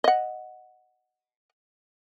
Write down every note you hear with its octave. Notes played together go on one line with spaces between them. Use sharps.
D#5 F#5